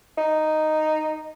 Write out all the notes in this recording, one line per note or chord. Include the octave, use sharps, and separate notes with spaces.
D#4